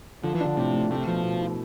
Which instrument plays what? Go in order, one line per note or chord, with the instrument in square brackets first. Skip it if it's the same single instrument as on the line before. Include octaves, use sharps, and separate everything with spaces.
[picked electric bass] D3 [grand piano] F3
[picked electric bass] E3
[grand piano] D4
[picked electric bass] D3
[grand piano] A2 [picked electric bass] C3
[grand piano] A3
[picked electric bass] C3 [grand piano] A3
[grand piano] B2 [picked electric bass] F3
[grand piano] B2
E4